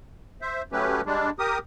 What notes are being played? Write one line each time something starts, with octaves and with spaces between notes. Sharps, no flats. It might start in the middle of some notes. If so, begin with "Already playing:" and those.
C5 E5
F#3 A3 C#4 G4 B4
G3 G#3 D4
G4 A#4 D#6